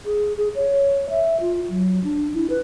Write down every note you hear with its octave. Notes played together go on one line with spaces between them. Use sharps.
G#4
G#4
C#5
E5
F4
F#3
D4
E4
B4